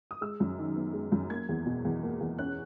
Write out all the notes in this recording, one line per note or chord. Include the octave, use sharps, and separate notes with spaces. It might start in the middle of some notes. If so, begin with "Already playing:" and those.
D#6
G#3 E6
F#2
D#3
B3
G#3
F#2
A#3 G#6
E2
B2
E2
A#3
E2
C#4 F#6